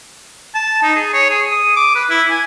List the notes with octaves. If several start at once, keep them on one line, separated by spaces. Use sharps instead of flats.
A5
D#4
G#4
C#5
G#4
D#6
D6
B4
E4
G#5